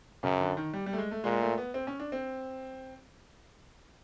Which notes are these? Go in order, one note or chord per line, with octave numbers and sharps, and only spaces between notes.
F#2 C#3
D3
D#3
G3
G3
A3
G#3
A3
A#2 G#3
A3
B3
C4
C#4
D4
C4